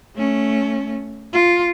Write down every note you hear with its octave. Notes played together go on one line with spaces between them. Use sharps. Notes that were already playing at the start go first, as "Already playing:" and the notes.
A3 C#4
F4